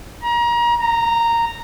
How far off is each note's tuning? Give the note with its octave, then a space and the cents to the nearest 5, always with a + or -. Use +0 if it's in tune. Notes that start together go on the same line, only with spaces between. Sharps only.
A#5 +30
A#5 -10